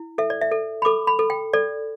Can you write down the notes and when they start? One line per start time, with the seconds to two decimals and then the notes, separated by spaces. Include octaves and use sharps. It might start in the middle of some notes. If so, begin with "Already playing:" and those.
Already playing: E4
0.18 A4 E5
0.30 D5
0.41 E5
0.52 A4
0.82 B5
0.85 A4 D6
1.07 B5
1.19 A4
1.30 G5
1.53 A4 D5